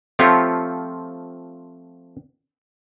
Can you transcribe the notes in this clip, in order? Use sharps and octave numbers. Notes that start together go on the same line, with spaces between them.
F3 A3 C4 F4 G4 C#5